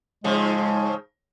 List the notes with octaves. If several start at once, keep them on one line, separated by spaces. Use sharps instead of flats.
G#2 C#3 F3 G#3